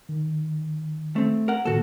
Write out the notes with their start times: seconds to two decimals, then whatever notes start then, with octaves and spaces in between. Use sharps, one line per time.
0.09 D#3
1.16 A3 C4
1.48 A#4 F#5
1.65 A2 D#3 A#3 F#4 A4